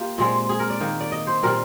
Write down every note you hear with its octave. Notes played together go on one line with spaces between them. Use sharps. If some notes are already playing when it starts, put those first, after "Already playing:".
Already playing: A#3 F4 G4
A#2 G#3 C4
G#4
A#4
D5
D#3 A#3
D5
D#5
C5
A#2 G3 C4 A#4